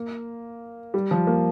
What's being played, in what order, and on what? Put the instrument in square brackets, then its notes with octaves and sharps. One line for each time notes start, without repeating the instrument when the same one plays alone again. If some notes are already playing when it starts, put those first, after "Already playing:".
Already playing: [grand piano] A#3
G3
F3
A#3